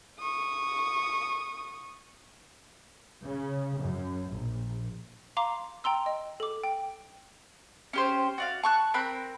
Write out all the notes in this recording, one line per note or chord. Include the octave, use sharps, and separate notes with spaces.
C#6 D#6
C#3
F#2
A#1
F5 A#5 C6 D6
G5 A#5 C6 E6
D#5
A4 D6
G5
C#4 G4 C5
F#4 D5 F5
A5 C#6 F#6
C4 A#4 B5 F#6